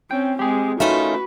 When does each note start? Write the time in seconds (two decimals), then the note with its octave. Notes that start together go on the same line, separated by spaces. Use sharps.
0.11 C4 C#4 G5
0.39 G#3 C4 G4 G#4
0.80 A3 C#4 D#4 F4 F#4 A#4 B4 E5